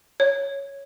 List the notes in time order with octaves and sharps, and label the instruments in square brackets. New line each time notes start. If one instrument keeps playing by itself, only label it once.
[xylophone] C#5